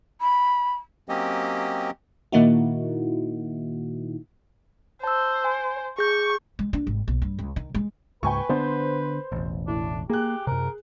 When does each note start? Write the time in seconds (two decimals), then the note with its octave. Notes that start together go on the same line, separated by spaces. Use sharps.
0.21 B5
1.09 F#3 A#3 C4 C#4 G4 D#5
2.32 A#2 D#3 A#3 D#4 E4 F#4
5.04 C5 A5 E6
5.44 G#5
5.98 G#4 C#6 G6
6.59 G#3
6.73 D4
6.87 G#1
7.08 B1
7.22 G2
7.39 C#2
7.56 D#3
7.74 G#3
8.23 C#2 G#2 B4 G5 G#5 C#6
8.49 D3 B3 D4 C5
9.32 E1 A1
9.68 A2 D4
10.10 A#3 G4 G#4 F#6
10.47 F#2 C3 A#4